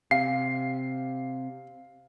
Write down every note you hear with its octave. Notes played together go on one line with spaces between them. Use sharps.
C3 F5 C7